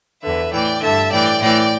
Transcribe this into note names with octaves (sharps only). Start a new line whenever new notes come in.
E2 D3 B4 E5
A2 E3 D5 G5
G2 D3 E5 A5
A2 E3 D5 G5
A2 E3 D5 G5